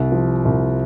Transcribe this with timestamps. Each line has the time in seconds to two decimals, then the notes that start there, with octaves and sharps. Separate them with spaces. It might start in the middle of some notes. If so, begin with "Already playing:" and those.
Already playing: C2
0.12 F3
0.45 C2